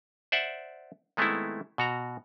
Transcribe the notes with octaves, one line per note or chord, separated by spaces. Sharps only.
C5 D5 E5 F#5
D#3 G#3 A3 B3 C4 E4
B2 F#4 A#5